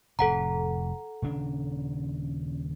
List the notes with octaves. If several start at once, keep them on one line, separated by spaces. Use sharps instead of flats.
F1 A2 A4 F#5 A#5
D#1 C#3 D4